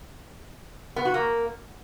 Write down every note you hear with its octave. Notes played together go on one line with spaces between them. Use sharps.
B3
F#4
A#3